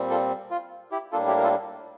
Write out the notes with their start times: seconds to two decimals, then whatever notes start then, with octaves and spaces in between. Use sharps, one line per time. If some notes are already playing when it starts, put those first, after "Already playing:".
Already playing: A#2 G3 C4
0.10 F4 A4
0.51 F4
0.91 E4 G4
1.12 A2 G3 A#3 D4 F4 A4
1.27 E4 G4
1.37 A#4
1.43 F4 A4